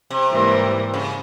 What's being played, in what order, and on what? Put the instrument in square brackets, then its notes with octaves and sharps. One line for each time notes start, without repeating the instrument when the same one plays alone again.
[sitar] C3
[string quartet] G#2 E3 G3 A#3
[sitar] C#3